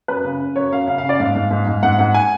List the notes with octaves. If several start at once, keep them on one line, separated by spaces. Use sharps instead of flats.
F#2 B4
C#3
C#3
F#2 C#5
F#2 F5
C#3 F5
C#3 F5
D5
G#2 F5
G#2
G#2
G#2
G#2 F#5
G#2 F#5
G#5